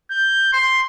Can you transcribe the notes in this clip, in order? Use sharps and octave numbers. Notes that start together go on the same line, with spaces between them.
G6
C6